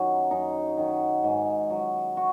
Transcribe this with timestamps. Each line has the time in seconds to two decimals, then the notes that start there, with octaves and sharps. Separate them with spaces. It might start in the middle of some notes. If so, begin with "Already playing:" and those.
Already playing: F#2 D#3 F#3 C#4 D#4
0.31 F#2 D#4
0.78 D#3 F#3
1.24 G#2
1.70 F#3
2.17 F#4